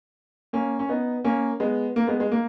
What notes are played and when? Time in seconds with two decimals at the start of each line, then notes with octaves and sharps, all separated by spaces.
0.53 A#3 C#4
0.79 C#4
0.89 B3 D#4
1.24 A#3 C#4
1.60 G#3 B3
1.96 A#3
2.07 G#3 B3
2.20 G#3
2.32 A#3